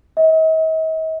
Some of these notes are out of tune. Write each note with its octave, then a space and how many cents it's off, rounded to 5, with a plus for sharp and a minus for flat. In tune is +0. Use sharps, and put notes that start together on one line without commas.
D#5 +45